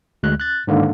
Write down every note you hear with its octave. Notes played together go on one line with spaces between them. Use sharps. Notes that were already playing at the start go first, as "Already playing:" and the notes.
D2 G#3 F#6
F#6 A6
G#2 D3 D#3 A#3